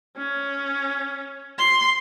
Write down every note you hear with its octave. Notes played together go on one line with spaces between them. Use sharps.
C#4
C6